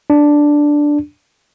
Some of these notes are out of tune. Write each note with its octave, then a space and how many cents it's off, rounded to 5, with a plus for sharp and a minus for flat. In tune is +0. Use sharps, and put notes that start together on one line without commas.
D4 +0